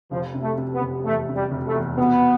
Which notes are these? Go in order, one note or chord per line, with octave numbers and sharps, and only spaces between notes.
F1 F3
C3
A3
C3
B3
F1
E2 A3
C3
G3
F1
A3
E2
B2 B3